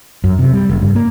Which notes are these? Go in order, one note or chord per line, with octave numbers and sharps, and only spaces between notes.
F#2
C3
G3
F#1
G2
A#3